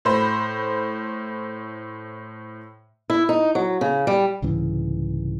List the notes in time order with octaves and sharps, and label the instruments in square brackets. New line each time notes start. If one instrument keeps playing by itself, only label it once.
[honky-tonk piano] A2 C5 B5
[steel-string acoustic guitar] E4
D#4
F#3
C#3
G3
[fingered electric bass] C2 G#2 C#3 E3